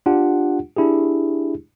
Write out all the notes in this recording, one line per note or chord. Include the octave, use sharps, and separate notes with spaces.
D4 F4 G4 F#5
D4 E4 G4 G#4